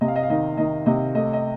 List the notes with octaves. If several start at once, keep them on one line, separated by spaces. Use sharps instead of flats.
C3 D#5
F5
D#5
F5
D#3 D#5
D#3 D#5
C3 D#5
A3 D#5
D#5